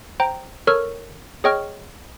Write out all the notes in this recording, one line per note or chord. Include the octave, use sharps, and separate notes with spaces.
C5 G5 A#5
A4 A#4 C#5 C#6 E6 F6
G#4 C#5 D#5 G5 C#6 F6